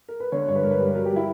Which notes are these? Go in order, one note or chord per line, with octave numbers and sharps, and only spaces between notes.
A#4
B4
D3 C#5
G2 C#5
B4
G2 A#4
B4
G3
F#3 A#4
G4
F#3 E4